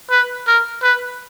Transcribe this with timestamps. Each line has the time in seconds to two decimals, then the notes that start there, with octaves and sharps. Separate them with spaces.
0.10 B4
0.47 A#4
0.83 B4